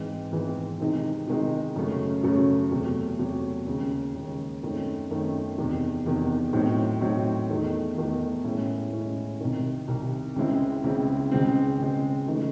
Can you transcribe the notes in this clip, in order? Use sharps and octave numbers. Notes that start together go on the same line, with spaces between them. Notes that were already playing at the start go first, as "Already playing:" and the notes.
Already playing: G#2 E3 G#3 C4
G#2 E3 G#3 C4
C3 D#3 G#3 D#4
C3 D#3 G#3 D#4
F#2 C#3 F#3 A3
F#2 C#3 F#3 A3
E2 C3 F#3 A3
E2 C3 F#3 A3
D#2 C#3 G#3
D#2 C#3 G#3
F#2 D#3 A3 C4
F#2 D#3 A3 C4
E2 C3 D#3
E2 C3 D#3
A2 F#3 C4 D#4
A2 F#3 C4 D#4
E2 D#3 A3 D#4
E2 D#3 A3 D#4
A2 G#3 C#4 E4
A2 G#3 C#4 E4
C2 C3 D#3
C2 C3 D#3
C#2 C#3 G#3 C4 E4
C#2 C#3 G#3 C4 E4
C#2 C#3 G#3 C4
C#2 C#3 G#3 C4
C#3 E3 A3 D#4